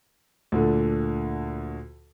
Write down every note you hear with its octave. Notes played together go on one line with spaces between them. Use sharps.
D2 A#2 D3